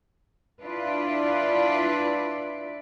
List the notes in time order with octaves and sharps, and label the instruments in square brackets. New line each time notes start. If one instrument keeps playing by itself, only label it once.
[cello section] D4 E4 F4 B4 D5